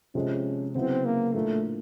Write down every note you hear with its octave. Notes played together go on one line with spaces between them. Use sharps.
C3 F3 G#3 C#4
C#3 F#3 B3 C4 E4
A#3
A2 F3 A3 A#3 D4 F4